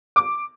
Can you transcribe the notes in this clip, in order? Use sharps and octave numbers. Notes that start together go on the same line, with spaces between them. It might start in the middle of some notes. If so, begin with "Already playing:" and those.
D6